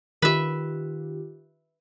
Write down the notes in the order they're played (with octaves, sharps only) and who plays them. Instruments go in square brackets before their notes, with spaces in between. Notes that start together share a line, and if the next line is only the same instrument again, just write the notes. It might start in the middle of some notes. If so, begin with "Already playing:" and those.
[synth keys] D#3 F4 G4 [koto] B4 E5